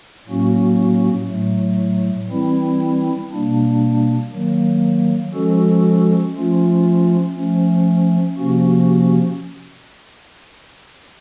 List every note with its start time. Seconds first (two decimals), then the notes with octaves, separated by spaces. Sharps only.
0.28 A2 F#3 A#3 C#4 F#4
1.28 A2 F#3 A3
2.30 E3 G3 C4 E4
3.32 B2 G3 A#3 D4
4.32 D#3 F#3 A#3
5.33 F3 G#3 C#4 F#4 A4
6.35 F3 A3 C#4 F4
7.36 F3 A3 C#4
8.38 C3 F3 A#3 C#4 F#4